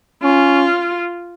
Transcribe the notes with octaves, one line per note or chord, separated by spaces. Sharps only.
C#4 F4